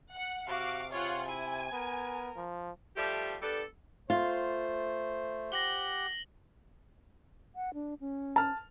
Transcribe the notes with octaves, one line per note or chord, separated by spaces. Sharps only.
F#5
C3 F#4 F5 D6
F4 G#4 C#5 F#5
E4 G#5
B3 A#4
F3
F3 G3 A3 G4
G3 B3 D4 A4
A3 F4 C5
G4 F#5 A#6 F#7 G7
F#5
D4
C#4
A5 F6